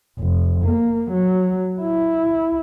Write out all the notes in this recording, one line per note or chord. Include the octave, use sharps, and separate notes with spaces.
F1
A#3
F#3
E4